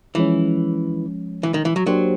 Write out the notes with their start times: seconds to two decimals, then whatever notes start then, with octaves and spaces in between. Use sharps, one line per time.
0.15 E3 F3 G#3 C#4
1.43 E3
1.54 D#3
1.65 E3
1.76 F#3
1.87 F#3 A#3 D4 G4 C5